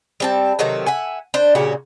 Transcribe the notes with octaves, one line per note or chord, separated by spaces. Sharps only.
G3 C4 A5
C3 D#3 F#3 A3
E5 F#5 G#5
D4 C5
A#2 C#3 F#4 G4